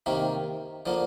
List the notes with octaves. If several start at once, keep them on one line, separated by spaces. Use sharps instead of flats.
C3 D#3 A#3
D3 F3 A#3